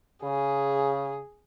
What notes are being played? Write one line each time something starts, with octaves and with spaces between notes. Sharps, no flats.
C#3 G#4